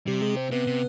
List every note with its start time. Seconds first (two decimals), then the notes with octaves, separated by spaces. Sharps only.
0.07 C3 G3 G4
0.22 G#3 G#4
0.36 C4 C5
0.51 C3 B3 B4
0.67 C3